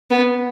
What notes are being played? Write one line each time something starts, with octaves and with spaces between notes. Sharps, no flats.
B3